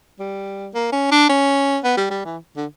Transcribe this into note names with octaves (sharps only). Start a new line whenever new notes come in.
G3
A#3
C#4
D4
C#4
B3
G3
G3
E3
D3